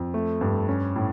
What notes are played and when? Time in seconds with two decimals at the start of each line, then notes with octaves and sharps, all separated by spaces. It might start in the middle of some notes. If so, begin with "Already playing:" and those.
Already playing: F2
0.14 A3
0.41 G2
0.68 C#4
0.96 A2